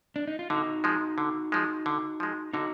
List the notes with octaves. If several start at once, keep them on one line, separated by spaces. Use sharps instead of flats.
D4
D#4
F4
D3 D#4 F#4
F3 G#3
D3
F3 G#3
D3
F3 G#3
D3 D#4 F#4